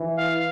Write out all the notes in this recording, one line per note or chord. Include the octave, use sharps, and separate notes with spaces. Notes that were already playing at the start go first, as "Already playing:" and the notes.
Already playing: E3
F5